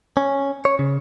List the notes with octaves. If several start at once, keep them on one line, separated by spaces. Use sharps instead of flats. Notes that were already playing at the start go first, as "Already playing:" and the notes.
C#4
C#5
C#3